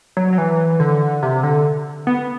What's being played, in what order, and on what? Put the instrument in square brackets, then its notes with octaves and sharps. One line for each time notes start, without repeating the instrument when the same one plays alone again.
[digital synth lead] F#3
F#3
E3
D3
C3
D3
B3